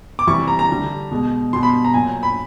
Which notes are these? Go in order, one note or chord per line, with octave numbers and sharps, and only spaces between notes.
D6
C3 E3 G3 C#6
A#5
A#5
D3 G3
B2 G#3
B2 G3 C6
B5
A#5
A#2 F#3 G#5
B5